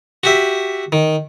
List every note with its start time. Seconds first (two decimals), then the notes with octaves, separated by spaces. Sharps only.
0.24 F#4 G4 E5
0.92 D#3